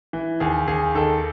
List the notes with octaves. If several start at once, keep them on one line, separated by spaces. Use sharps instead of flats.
E3
D#2 G#4
D#2 G#4
D#3 A4